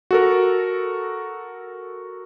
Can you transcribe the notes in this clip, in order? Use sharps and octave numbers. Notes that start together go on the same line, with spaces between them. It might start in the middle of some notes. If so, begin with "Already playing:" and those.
F#4 A4 A#4